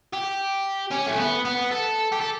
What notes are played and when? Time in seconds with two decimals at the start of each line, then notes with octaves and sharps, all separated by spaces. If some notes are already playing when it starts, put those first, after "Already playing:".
0.13 G4
0.92 C#4
1.08 A3
1.18 B3
1.45 B3
1.71 A4
2.12 G4
2.20 A4